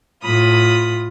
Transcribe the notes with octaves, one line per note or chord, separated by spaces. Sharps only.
A2 F4 B5 D#6